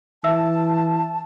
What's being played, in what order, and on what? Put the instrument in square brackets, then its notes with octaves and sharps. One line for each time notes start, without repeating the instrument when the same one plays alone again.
[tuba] E3 [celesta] E5 E6 [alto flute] A5